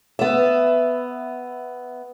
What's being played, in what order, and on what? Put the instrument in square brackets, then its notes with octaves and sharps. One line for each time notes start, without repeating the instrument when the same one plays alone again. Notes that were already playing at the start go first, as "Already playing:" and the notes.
[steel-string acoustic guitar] B3 E5